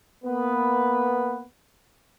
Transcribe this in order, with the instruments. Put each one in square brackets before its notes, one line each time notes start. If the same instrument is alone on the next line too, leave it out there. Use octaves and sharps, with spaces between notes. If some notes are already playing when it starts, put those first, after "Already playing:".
[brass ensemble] A#3 B3 B4